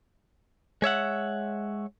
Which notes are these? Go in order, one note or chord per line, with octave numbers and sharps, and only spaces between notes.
G#3 C#5 E5 F#5